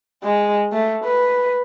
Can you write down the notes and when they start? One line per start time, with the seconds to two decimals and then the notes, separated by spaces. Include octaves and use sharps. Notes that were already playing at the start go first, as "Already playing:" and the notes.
0.23 G#3
0.72 A3
1.04 B4